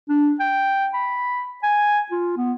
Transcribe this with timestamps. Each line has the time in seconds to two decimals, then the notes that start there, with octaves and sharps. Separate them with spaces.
0.09 D4
0.40 G5
0.93 B5
1.63 G#5
2.11 F4
2.37 B3